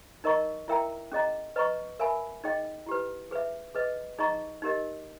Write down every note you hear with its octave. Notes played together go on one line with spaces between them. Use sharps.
D#4 A#4 D#5 A#5 C#6
E4 A#4 E5 G5 A#5
C#4 G#4 D#5 A#5
B4 D#5 A#5 C#6
A#4 E5 G#5 B5
D#4 G#4 D#5 G5
E4 G4 B4
G#4 B4 E5
G#4 B4 D#5
D#4 G#4 D#5 A#5 C#6
D#4 G4 A#4 D#5